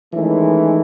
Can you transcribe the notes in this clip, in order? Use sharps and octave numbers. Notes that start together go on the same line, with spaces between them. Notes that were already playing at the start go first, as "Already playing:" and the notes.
D#3 E3 G#3 A3 C#4